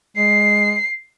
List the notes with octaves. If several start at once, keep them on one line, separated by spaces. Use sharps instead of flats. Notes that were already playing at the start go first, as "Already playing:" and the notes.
G#3 C7